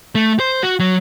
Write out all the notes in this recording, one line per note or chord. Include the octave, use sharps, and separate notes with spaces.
A3
C5
F#4
F#3